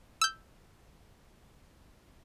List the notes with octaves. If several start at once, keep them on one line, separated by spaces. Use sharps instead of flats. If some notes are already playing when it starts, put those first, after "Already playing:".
E6 G6